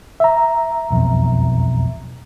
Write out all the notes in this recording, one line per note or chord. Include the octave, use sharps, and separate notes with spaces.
E5 A#5
E1 B1 F2